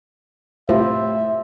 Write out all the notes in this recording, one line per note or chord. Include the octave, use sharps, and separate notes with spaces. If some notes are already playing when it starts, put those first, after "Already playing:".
A2 C3 F4 C5 E5